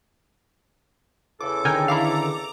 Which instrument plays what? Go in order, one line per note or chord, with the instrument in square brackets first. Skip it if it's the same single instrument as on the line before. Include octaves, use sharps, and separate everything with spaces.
[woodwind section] E2 C#3 A4 [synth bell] D6
[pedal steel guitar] D3 D#3 D#4 [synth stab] A#4 G5 G#5
[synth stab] E4 F5 [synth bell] A#5 D6 F7